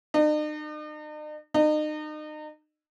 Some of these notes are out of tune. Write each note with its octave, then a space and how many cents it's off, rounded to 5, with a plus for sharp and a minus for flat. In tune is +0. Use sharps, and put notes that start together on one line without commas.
D#4 -45
D#4 -35